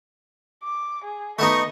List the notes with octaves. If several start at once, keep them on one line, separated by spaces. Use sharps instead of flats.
D6
G#4
A3 B3 D#4 D#5 C#6